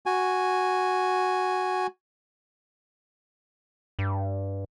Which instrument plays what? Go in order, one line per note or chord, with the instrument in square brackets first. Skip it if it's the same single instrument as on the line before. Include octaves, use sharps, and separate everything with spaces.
[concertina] F#4 G#5
[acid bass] G2